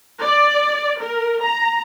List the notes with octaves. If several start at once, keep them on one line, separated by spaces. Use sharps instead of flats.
D5
A#4
A#5